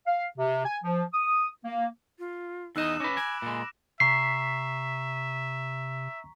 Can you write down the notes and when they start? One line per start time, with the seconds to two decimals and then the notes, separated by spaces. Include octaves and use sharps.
0.07 F5
0.38 C3
0.66 G#5
0.84 F3
1.14 D#6
1.65 A#3
2.19 F4
2.76 E2 D#4 D#5 E6 F#6 E7
3.00 C#4 B4 D6 A#6
3.17 G#5 B5 D7
3.42 A#2 G#3
4.00 C3 E5 A#5 C#6 B6 C7